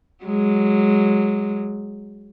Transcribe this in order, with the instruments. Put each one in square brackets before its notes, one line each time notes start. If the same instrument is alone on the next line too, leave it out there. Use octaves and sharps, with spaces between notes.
[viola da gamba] F#3 G#3